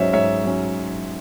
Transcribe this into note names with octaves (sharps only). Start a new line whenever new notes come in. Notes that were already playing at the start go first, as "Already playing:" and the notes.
Already playing: G#2 F#3 C#4 C5 C#5 D#5 E5
G#2 C#5 E5
F#3 C#4